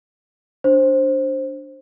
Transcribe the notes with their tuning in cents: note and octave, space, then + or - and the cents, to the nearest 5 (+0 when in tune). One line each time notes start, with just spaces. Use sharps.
D4 +0 C5 +15